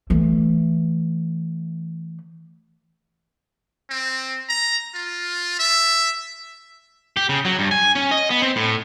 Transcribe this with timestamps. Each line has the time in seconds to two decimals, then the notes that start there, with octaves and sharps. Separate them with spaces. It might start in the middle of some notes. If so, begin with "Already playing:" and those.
0.10 E3 A3
3.90 C4
4.49 A#5
4.94 F4
5.59 E5
7.17 G4
7.29 C#3
7.45 F#3
7.59 G2
7.71 G#5
7.95 C#4
8.11 D#5
8.30 B3
8.42 C4
8.56 A2